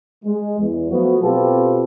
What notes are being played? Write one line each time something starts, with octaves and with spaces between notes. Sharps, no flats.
G#3
E2
F3 F#3 A3 B3 F#4
B2 C4 F4 G4 A4 B4